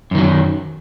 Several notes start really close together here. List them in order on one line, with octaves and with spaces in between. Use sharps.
F#2 D#3 F#3